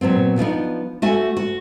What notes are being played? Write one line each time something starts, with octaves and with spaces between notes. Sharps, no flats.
A#2 F#3 B3 C4
F3 B3 D4 D#4
A3 F#4 E5 G#5
F#4